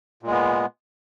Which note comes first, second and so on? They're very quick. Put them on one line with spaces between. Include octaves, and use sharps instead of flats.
A#2 G#3 B3